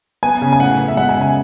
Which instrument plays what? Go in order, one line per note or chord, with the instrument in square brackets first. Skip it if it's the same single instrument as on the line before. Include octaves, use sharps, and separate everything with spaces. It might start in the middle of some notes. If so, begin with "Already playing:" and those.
[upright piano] B3 G#5
C#3
G#5
A2 F#5
B3
E5
G#3 F#5
G#5
C#3
G#5